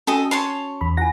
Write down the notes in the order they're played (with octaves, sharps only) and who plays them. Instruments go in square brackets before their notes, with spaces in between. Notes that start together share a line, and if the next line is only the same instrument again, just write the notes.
[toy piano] C#4 F#4 G#5 [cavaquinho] A4 D#5
[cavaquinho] C#5 A5 C6
[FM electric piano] E2 B5
[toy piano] E4 F4 G#5 [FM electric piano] F#5 A#6